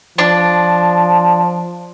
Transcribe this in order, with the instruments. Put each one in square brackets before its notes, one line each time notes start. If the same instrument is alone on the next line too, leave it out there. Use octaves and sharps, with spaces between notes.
[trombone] F3 [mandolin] D4